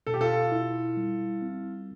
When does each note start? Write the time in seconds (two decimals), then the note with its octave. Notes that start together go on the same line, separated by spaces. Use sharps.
0.07 B2 A4
0.14 G4
0.21 F4 A4
0.52 E4
0.97 G3
1.42 C4